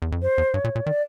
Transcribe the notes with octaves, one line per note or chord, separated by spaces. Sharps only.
E2
F2
F#2 C5
E2
G2 C#5
A#2
A#2
D#3 D5